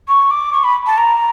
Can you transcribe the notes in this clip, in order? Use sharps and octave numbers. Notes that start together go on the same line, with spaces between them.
C#6
D6
C#6
B5
A5
A#5